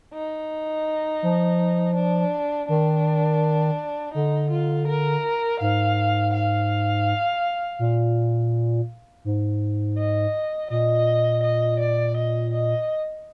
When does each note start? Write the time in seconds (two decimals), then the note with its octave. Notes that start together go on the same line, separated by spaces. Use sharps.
0.14 D#4
1.23 F3
1.95 D4
2.68 D#3 D4
4.14 D3 D#4
4.51 F4
4.88 A#4
5.60 G#2 F5
6.33 F5
7.79 A#2
9.25 G#2
9.97 D#5
10.70 A#2 D#5
11.43 D#5
11.80 D5
12.17 D#5
12.53 D#5